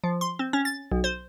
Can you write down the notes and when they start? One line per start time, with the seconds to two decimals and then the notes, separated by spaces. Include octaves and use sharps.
0.04 F3
0.21 C6
0.39 C4
0.53 C#4
0.65 A6
0.92 B1
1.04 C5